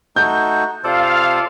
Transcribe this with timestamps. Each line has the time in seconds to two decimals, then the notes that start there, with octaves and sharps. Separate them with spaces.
0.16 A3 D#4 F#4 G6
0.84 C3 F4 A4 C5 D5 F5